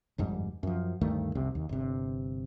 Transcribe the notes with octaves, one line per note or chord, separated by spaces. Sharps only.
G1 F2 G#2 G3
F#2 F3
D2 G2 D#3 A3
F1 C2 C3
D#2
G1 C3